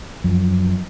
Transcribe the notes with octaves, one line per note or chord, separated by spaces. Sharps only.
F#2 F3